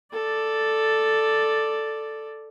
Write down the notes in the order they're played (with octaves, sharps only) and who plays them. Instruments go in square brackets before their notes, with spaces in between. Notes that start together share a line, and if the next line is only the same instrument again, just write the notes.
[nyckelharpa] A4 D5